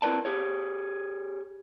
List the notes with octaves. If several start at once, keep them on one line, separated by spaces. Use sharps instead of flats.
C4 E4 A#4 B4 D5 A5
G4 G#4 C#5